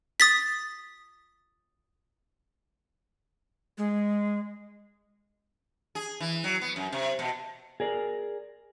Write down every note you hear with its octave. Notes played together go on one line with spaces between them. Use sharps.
D#6 A6 B6
G#3
G#4
E3
F#3
B3
F#2
C3
B2
G#4 A#4 D5